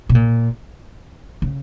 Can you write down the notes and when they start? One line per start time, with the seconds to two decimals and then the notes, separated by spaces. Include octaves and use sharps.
0.09 B2
0.15 A#2
1.42 C#3